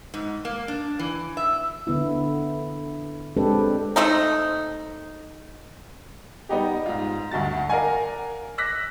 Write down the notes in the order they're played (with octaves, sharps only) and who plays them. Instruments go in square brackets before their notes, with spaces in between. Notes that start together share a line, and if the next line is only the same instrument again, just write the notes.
[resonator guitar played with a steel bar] G#2
A#3
D4
E3
E5
[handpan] D3 B3 E4
G#3 C4 D4 G4 A4 B4
[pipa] A3 C4 D#4
[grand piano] G3 B3 D#4 G4
G#2 F4
D2 G2 F#4 A6
A#4 D5 F5 F#5 G#5
D6 E6 F#6 A#6 B6